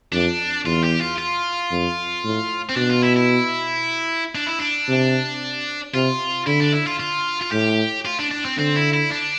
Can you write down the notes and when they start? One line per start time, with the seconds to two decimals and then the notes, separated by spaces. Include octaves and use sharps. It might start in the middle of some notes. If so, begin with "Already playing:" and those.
0.12 F2 D4
0.65 E2 F4
0.83 G4
1.00 F4
1.18 F4
1.71 F2
2.24 A2
2.69 C4
2.76 B2 D4
2.90 F4
3.03 E4
3.17 E4
4.35 D4
4.47 E4
4.59 D4
4.88 C3
5.94 C3 F4
6.46 D3 E4
6.60 D4
6.73 E4
6.87 F4
7.00 F4
7.42 F4
7.52 A2 G4
8.05 F4
8.19 D4
8.31 D4
8.45 C4
8.58 D3 C4
8.76 E4
8.93 E4
9.11 D4